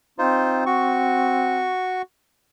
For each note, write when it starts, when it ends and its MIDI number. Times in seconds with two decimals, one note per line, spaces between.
0.18 1.71 60
0.18 0.64 63
0.18 0.64 65
0.18 0.64 72
0.66 2.02 66
0.66 2.02 85